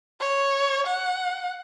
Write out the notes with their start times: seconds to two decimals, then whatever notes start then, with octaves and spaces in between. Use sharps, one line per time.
0.20 C#5
0.87 F#5